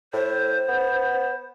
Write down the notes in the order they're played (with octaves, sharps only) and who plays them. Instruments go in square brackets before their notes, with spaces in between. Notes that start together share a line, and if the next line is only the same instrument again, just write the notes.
[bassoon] A2 [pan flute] C5
[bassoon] B3